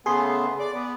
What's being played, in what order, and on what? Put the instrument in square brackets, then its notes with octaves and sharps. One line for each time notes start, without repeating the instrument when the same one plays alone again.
[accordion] C#3 A3 B3 [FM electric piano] G#4 C6
[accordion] D5
B3